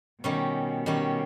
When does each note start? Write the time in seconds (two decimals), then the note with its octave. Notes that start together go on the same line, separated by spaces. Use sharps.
0.23 B2 D#3 G3 C#4
0.86 D#3 G3 C#4